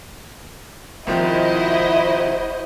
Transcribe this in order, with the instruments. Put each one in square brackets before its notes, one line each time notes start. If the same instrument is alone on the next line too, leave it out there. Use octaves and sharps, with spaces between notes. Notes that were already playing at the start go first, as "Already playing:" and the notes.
[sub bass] E1 [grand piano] C2 D#3 F3 [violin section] E4 F#4 D#5 [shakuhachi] C5